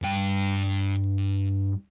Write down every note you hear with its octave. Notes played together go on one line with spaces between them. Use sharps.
G2 G5